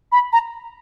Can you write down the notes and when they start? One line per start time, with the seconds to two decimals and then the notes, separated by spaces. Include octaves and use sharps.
0.12 B5
0.33 A#5